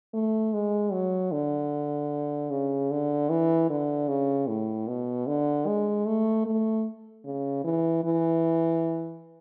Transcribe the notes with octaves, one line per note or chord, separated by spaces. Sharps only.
A3
G#3
F#3
D3
C#3
D3
E3
D3
C#3
A2
B2
D3
G#3
A3
A3
C#3
E3
E3